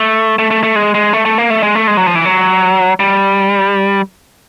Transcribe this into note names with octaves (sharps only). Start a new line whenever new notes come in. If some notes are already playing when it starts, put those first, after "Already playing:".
Already playing: A3
A3
A3
A3
G#3
G#3
A3
A3
A#3
A3
G#3
A3
G#3
F#3
F3
E3
F#3
G3